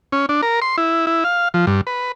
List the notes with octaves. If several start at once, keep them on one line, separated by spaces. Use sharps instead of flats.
C#4
D4
A#4
C6
E4
E4
F5
F3
G2
B4